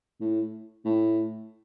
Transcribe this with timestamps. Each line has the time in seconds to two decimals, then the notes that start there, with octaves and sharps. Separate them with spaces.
0.20 A2
0.85 A2